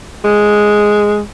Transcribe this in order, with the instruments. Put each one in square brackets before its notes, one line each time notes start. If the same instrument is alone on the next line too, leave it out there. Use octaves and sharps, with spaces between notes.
[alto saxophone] G#3